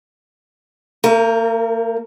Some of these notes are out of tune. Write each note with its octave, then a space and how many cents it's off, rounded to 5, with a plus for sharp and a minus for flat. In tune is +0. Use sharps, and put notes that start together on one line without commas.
A#3 -45 A#4 +0